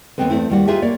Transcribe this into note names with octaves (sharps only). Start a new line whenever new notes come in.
D#2 G#3 B3 C4 A4 B4
E2 A3 C4 E4
D#2 G3 F#4
D#4 F4 G4 G#4 B4 E5
A#3 C#5 D5